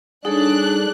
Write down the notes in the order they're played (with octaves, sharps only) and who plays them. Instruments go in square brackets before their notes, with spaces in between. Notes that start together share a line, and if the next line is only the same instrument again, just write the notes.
[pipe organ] G3 [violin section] D4 F#6 [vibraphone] D#4 A4 C#5 [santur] G#4